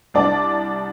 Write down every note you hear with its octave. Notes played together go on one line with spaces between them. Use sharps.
C2 D4 D5